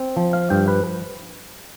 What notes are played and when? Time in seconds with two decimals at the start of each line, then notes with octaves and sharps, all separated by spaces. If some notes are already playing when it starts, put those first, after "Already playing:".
Already playing: C4
0.16 F3
0.33 F5
0.50 G2 G5
0.68 B4